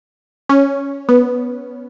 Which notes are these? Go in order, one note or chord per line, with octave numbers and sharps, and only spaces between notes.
C#4
B3